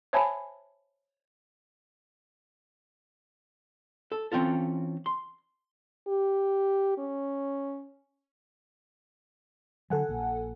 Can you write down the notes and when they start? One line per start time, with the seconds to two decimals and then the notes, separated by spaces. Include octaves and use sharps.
0.13 C5 C#5 E5 G#5 A5 B5
4.12 A4
4.32 E3 C4 C#4 F4 A4
5.06 C6
6.07 G4
6.98 C#4
9.90 D3 F#3 A4 F#5 G#5
10.09 A#1 A#2